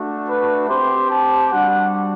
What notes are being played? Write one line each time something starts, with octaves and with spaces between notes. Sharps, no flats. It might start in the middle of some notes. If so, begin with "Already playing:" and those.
Already playing: A3 D4 F#4
B4
C4 G4 C5
A5
G3 D4 F#4 F#5